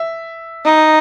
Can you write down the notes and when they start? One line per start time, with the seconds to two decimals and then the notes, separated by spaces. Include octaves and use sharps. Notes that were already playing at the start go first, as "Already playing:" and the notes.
Already playing: E5
0.65 D#4